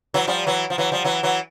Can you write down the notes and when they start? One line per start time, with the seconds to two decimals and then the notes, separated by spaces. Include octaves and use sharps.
0.14 E3 F#3
0.27 F3 G3
0.47 E3 F#3
0.70 F3
0.78 E3 F#3
0.92 F3 G3
1.04 E3 F#3
1.23 E3 F#3